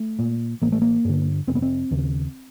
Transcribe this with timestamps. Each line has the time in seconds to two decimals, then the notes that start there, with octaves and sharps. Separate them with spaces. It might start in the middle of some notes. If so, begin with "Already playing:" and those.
Already playing: A3
0.19 A#2
0.62 A1 A#3
0.72 A3
0.82 A#3
1.05 G2 D3
1.47 F1 C4
1.55 B3
1.62 C4
1.91 D#2 C#3